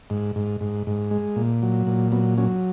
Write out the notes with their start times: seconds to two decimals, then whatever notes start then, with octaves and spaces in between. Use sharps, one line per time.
0.10 G#2
0.36 G#2
0.61 G#2
0.87 G#2
1.11 G#3
1.36 A#2
1.63 F#3
1.87 A#2
2.12 F#3 B3
2.38 F#3 C#4